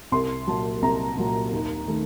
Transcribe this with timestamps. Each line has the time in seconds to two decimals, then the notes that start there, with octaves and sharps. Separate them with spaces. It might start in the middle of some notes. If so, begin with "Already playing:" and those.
0.12 C2 C6
0.47 A#2 F#3 A5
0.82 C2 A#5
1.17 A#2 F#3
1.52 D#2
1.88 D#3 A3